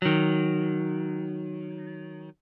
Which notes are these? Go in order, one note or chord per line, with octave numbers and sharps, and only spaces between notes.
D#3 F#3